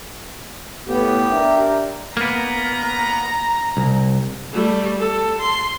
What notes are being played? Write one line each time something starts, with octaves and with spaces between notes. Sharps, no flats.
A2 B3 G4
D4 A#4 E5
A#3 B3 A#5
C2
G3 A3
A4
C6